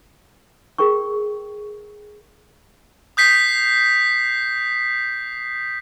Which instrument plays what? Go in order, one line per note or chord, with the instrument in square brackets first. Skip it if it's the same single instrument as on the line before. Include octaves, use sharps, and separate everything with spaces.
[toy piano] G#4 A#4 G5 C#6
[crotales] D#6 G6 B6 C7